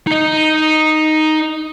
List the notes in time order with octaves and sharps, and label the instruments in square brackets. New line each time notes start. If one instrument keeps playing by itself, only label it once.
[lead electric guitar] D#4 D#5